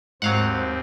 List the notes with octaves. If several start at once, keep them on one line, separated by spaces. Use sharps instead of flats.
D#2 G#2 F#3 C4 F5 F#5